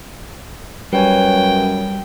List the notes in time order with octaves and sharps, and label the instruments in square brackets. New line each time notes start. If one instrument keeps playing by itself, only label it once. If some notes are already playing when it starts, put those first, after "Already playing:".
[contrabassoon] F#2 [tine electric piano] G3 [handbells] B4 C#5 G#5 [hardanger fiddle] G5